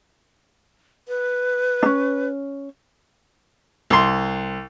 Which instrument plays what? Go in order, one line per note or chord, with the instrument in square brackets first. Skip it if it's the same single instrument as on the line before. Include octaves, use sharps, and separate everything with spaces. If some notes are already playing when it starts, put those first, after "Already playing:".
[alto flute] B4
[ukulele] C#4 D4
[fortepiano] C2 C6